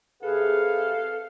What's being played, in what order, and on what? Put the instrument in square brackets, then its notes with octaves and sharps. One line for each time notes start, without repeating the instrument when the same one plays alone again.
[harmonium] C3 G#4 B4 [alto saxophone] A4 [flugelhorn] F5